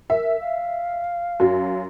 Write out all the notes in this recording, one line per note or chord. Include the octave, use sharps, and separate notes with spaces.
A#4 E5
F5
F#2 F#3